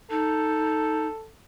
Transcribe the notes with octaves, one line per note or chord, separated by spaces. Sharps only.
D#4 A4